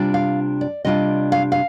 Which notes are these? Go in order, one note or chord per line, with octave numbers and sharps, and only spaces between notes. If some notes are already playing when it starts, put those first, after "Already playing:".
Already playing: C3 G3 D4 F4
F5
D5
C3 G3 D4 F4 D#5
F5
F5